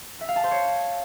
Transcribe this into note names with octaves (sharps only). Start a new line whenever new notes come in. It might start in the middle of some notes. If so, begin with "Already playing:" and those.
E5
F5
A5
C5
C#5